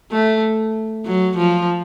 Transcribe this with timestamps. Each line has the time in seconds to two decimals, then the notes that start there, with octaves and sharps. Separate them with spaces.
0.11 A3
1.05 F#3
1.37 F3